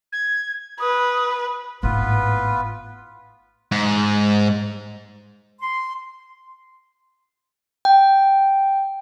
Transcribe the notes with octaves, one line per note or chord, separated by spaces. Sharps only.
G#6
B4 D#6
G#1 A2 B3 F4 B4
G#2
C6
G5